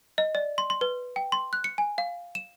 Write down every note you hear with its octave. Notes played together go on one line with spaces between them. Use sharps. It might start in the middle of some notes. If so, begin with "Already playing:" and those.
D#5
D5
C6
C6
B4
G5
C6
F#6
C#7
G#5
F5
E7